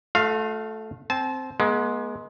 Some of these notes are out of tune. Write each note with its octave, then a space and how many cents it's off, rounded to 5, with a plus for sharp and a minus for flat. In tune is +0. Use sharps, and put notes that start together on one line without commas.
A3 -10 F4 +45 F5 +0
C4 +0 A5 -30
G#3 +15 B3 -45